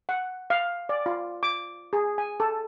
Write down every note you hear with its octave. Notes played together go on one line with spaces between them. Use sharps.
F#5
F5
D5
F4
D6
G#4
G#5
A4